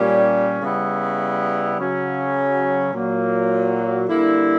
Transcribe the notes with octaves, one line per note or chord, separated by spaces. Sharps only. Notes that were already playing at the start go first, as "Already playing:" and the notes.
Already playing: A#2 G3 C#4
C#3 G3 B3 E4
C#3 F#3 C#4
A#2 F#3 A#3
D3 G3 A#3 E4